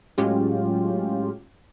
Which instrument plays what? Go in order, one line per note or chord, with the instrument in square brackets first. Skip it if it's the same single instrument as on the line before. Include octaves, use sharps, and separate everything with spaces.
[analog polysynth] A2 F#3 G#3 C#4 F4 G4